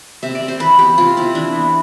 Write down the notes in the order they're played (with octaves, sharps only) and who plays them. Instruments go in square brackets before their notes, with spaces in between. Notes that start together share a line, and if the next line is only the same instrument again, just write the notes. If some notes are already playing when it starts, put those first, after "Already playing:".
[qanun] C3 E5
D5
C3
C5
E3 B4
B3 G4
C3 F4
C3 E4
E3 D4
B3